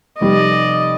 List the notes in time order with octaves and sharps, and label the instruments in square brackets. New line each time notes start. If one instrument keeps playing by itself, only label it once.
[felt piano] F1 G3 [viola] D5 D#5